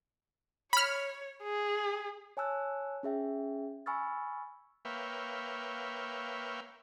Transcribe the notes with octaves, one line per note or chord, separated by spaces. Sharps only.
C#5 B5 F6
G#4
C#5 G#5 A5 E6 F#6
C#4 G#4 E5 G5
G#5 B5 C#6 E6 F6 A6
A#3 B4 C#5 E5 F5 G5